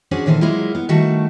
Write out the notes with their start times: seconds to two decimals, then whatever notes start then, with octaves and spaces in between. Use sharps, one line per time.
0.11 C#4 D4 F#4 G#4 C5
0.26 A#2 D#3 E3 A4 C5
0.41 F#3 G#3 A#3 E4 F4
0.75 B3
0.89 D#3 G3 A3 F#4 A5